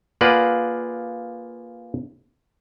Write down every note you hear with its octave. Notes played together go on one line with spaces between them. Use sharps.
A#3 F4 G#4 B4 D5 F#5